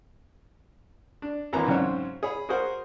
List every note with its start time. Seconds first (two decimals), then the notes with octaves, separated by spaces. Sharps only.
1.22 D4
1.53 G#1 E3 A#3 A#5
1.66 G#2 C#3 F#3 C4 C#5
2.23 G#4 C#5 B5
2.49 F#4 G#4 A#4 C5 F#5